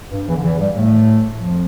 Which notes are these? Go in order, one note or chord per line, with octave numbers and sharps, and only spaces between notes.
G2
E2 E3
D3
E2 E3
G2 G3
A2 A3
F2 F3